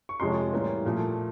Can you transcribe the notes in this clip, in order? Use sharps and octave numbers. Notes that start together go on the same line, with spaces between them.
C#6
F2 C3 F3 G#3 C#4 C6
A2 E3 G3 A#3 C#4
A#2 F3 A3